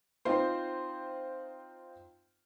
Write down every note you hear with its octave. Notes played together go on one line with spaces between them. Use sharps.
C4 D#4 F4 C5